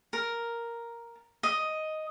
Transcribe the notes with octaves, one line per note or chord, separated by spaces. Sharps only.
A#4
D#5